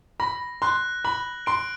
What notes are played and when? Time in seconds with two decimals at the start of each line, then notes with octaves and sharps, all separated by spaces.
0.20 B5 A#6
0.62 C6 F#6
1.05 B5 F#7
1.46 C6 D7